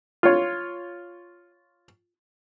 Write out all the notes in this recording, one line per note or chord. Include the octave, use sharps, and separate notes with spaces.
F4 C#5